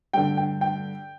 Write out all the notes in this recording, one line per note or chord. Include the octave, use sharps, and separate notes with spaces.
G2 D3 G5
G5
G5